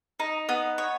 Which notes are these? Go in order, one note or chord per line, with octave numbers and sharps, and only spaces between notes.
D#4
B3
C#5